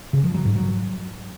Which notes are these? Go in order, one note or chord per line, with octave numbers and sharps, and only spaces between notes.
C#3
F3
F#3
G#2
F#3